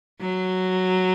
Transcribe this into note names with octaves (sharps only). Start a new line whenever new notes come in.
F#3